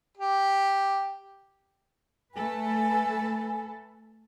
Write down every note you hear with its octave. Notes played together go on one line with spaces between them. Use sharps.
G4
A3 A4 B4 G#5